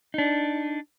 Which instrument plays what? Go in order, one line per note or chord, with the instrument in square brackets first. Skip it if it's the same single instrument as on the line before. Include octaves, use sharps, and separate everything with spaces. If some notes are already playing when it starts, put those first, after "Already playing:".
[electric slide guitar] D4 D#4